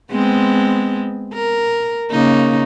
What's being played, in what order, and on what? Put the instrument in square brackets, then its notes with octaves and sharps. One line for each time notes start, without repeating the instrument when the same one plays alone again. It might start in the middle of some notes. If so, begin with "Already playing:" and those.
[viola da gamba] G#3 B3 C4
A#4
C#3 A#3 D#4